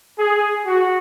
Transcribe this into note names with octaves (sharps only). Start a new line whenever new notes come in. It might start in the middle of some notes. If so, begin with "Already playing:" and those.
G#4
F#4